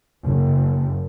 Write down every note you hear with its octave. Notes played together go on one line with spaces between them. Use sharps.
F#1